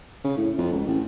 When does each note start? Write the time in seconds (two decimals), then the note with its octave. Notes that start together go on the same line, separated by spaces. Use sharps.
0.24 C#3
0.37 A2
0.58 F2
0.73 C#2
0.87 A1